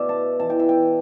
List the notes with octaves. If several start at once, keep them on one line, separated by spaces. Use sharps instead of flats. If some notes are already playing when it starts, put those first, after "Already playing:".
Already playing: B2 D5 E5
A5
E3 A5
G5
E5
G5